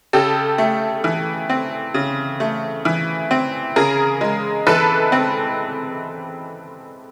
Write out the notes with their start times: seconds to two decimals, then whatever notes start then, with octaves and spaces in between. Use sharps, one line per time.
0.13 C#3 G4 A4
0.58 A3
1.04 E3
1.50 C4
1.94 C#3
2.40 A3
2.85 E3
3.31 C4
3.76 C#3 G#4 A#4
4.21 G#3
4.67 E3 A4 B4
5.12 C4